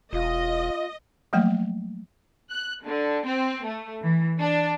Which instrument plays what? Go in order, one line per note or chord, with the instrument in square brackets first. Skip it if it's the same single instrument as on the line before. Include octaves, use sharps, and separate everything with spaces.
[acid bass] E1 [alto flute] F4 [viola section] D#5
[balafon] F3 F#3 A3 A#3 G5
[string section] F#6
D3
C4
A3
E3
D4